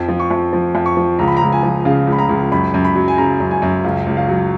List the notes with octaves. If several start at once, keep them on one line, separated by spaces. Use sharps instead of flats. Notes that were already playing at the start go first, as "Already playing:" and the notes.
Already playing: F2
F3
C#6
F2
F3
F2
C#6
F3
C#2 A#5
B5
A#5
C#2
G#5
F3
C#3 F5
C#2
B5
A#5
C#2
F#2 B5
F#2
B5
F#3
G#5
C#3 A#5
F#2
G#5
F#2
C#2 F5
C#2
F5
F#3